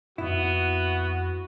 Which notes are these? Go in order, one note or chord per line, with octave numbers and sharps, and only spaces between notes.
F2 B3 E4 F#4